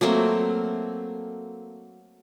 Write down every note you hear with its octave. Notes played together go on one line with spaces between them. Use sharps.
F#3 A3 A#3 C4